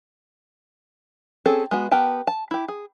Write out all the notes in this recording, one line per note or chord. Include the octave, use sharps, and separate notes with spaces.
C4 C#4 G#4 A4
G#3 B3 F#4
B3 G4 A#4 G5 A5
A5
E4 G4
G#4